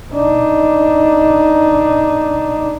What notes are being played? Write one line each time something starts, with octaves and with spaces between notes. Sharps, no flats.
D4 D#4